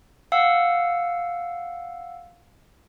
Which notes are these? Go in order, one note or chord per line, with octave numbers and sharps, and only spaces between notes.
F5 F#5 E6